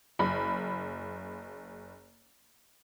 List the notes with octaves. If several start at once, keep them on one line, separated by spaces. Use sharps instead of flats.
F#1 B5